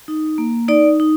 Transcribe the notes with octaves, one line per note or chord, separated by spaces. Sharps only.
D#4
A#3
D#4 D5
D#4